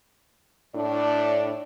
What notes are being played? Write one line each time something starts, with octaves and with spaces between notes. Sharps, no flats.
A2 D4 D5